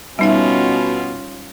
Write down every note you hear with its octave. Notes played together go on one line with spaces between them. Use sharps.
B2 G3 C#4 D#4 F4 E5